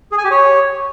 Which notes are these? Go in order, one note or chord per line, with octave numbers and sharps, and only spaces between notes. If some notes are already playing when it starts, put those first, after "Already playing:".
G#4
G#5
G4
C#5